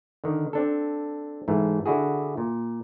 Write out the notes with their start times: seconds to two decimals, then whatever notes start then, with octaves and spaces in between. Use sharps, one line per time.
0.24 D3 D#3
0.53 C4 D4 A4
1.48 G#2 E3 A3
1.86 D3 E4 F#4 G#4
2.37 A#2